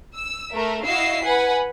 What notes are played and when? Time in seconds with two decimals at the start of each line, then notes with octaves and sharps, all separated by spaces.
0.18 E6
0.55 A3 A#4 E5
0.86 E4 F#4 D#5 F5 E6 C7
1.24 B4 F#5 G#5 B5